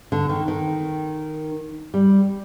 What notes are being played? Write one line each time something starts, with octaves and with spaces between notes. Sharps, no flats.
D3
D#3
D#3
G3